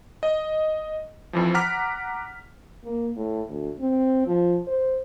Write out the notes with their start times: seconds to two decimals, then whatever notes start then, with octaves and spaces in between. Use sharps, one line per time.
0.23 D#5
1.33 F2 E3 F3
1.54 F#5 A#5 D6 F6 B6
2.84 A#3
3.16 A2
3.49 D2
3.80 C4
4.27 F3
4.67 C5